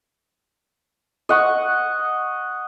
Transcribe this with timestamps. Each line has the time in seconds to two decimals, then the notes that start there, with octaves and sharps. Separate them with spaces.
1.29 D#5 F#5 C#6